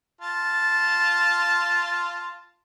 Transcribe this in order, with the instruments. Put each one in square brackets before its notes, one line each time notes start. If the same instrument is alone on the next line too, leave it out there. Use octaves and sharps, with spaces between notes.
[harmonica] F4 A5